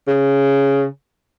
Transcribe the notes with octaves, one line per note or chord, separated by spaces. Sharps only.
C#3